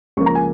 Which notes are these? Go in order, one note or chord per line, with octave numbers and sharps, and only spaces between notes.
C#2 C#3 F3 A#3 C#6
A#5
G#5